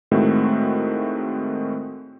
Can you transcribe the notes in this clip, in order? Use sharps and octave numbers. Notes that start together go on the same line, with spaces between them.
A2 D#3 G#3 A3 C4 F#4